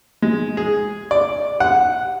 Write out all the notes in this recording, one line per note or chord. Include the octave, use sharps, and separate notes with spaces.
G#3
G#4
D5
F#5